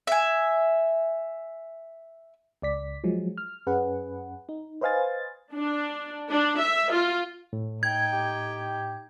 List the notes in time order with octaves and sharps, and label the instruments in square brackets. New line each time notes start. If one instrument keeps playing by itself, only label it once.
[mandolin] E5 G#5
[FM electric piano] C#2 D5 B6
F3 F#3 G#3
F6
F#2 C#4 G#4 B4 F#5
D#4
B4 C5 D#5 F5 G#5 A6
[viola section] D4
D4
E5
F4
[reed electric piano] A2
[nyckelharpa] D#4 G5 [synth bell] G#6
[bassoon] G4